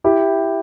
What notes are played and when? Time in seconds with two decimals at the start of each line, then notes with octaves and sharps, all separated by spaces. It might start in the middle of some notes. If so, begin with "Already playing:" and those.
0.04 E4 G4